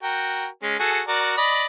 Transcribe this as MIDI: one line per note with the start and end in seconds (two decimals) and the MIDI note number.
0.03 0.47 66
0.03 0.47 70
0.03 0.47 79
0.63 0.78 56
0.63 0.78 61
0.79 1.01 66
0.79 1.01 68
0.79 1.01 69
1.08 1.32 66
1.08 1.32 70
1.08 1.32 74
1.37 1.66 74
1.37 1.66 75
1.37 1.66 83